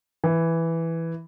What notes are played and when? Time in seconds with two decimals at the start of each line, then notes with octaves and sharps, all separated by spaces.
0.24 E3